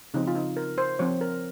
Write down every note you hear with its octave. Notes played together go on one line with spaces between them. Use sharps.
C#3 F3 C4 D#4
F4
D#4
A#4
C5
F3 C4 C#5
A#4